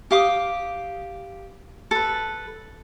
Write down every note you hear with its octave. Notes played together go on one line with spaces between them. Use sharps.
G4 F5 D6 D#6
A4 B4